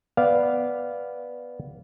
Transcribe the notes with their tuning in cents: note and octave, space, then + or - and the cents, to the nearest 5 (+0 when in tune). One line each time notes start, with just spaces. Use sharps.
B3 +0 D5 +0 F5 -5